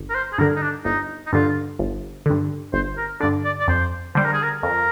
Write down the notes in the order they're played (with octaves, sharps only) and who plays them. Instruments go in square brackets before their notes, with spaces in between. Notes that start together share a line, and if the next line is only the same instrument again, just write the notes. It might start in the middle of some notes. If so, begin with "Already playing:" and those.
Already playing: [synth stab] G1
[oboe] A#4
C5
G#4
[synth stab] G2 D3 [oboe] A#4
[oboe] D#4
D4
[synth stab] G1 [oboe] D#4
[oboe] D#4
[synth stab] G2 D3 [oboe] F4
[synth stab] G1
G2 D3
[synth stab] G1 [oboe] C5
[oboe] A#4
[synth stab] G2 D3 [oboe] D5
[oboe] D5
D5
[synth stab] F2 [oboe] C5
[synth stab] D3 G3 [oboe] C5
[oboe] A#4
G#4
A#4
[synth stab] F2 [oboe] A#4